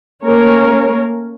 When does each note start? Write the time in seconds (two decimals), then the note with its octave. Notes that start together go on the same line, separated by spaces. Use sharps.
0.24 A3 A#3 C#4 A#4 C#5